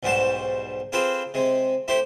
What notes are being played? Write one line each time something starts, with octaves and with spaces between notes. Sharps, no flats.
B1 G#2 G3 F#4 C5 A5
C4 F4 G#4 A4 B4 C5
C3 G#3
A3 E4 G4 C5